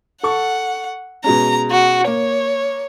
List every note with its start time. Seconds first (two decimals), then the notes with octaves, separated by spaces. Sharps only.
0.23 A4 F#5 C#6
1.24 B2 G#3 C#4 A#5
1.71 F#4
2.07 A#3 C#5